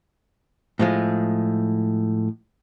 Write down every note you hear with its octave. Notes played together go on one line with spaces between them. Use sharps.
A2 F3 G#3